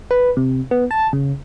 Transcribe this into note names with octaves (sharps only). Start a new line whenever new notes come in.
B4
C3
B3
A5
C#3